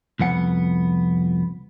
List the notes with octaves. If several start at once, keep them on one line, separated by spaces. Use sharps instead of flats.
C2 F2 B3 F#5